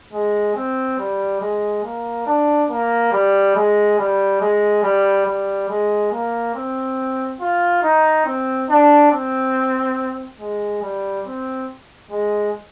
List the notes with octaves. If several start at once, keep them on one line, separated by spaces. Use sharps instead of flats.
G#3
C4
G3
G#3
A#3
D4
A#3
G3
G#3
G3
G#3
G3
G3
G#3
A#3
C4
F4
D#4
C4
D4
C4
G#3
G3
C4
G#3